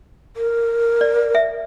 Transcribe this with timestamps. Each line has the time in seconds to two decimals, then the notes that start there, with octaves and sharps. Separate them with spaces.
0.37 A#4
1.01 D5
1.35 E5